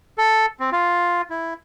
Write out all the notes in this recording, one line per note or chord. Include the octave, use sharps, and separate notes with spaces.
A4
C4
F4
E4